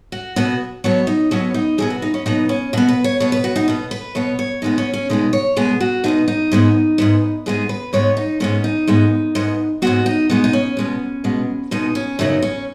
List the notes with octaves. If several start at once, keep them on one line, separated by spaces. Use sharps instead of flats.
F#4
B2 F#3 B3 F#4
B2 F#3 B3 C#5
D#4
B2 F#3 B3 C#4
D#4
B2 F#3 B3 G#4
F#4
D#4
C#4
B2 F#3 B3 D#4
C#4
B2 B3 F#4
B4
C#5
B2 B3 C#5
B4
F#4
D#4
B2 B3
B4
B2 B3 C#5
C#5
B2 G#3 B3 D#4
C#4
C#4
B2 G#3 B3 D#4
C#5
B2 G#3 B3 G#4
F#4
B2 G#3 B3 D#4
D#4
G#2 G#3 B3
G#2 G#3 B3
G#2 G#3 B3 G#4
B4
G#2 G#3 B3 C#5
D#4
G#2 G#3 B3 C#4
D#4
G#2 G#3 B3
G#2 G#3 B3
G#2 G#3 B3 F#4
D#4
B2 G#3 B3 D#4
D#4
C#4
B2 G#3 B3
B2 G#3 B3
B2 G#3 B3 D#4
C#4
F#2 C#3 F#3 B3 D#4
C#4